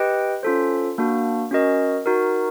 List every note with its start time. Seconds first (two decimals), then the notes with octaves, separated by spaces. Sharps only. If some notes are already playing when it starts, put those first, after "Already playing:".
Already playing: G4 B4 D#5 G5
0.43 C#4 F4 A4 C5
0.98 A#3 D4 F#4
1.51 C#4 F#4 A#4 D#5
2.06 D#4 F#4 A#4